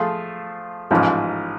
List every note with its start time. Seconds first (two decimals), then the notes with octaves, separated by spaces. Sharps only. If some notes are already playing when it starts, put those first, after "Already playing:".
Already playing: F3 A3 F4 G#4
0.91 A1 G#2 F3